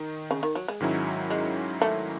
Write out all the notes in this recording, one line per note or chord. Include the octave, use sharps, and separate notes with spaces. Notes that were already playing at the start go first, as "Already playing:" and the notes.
Already playing: D#3 D#4
C#3
D#3
F#3
G#3
G#2 D#3 F#3 C#4 E4
G#3
A3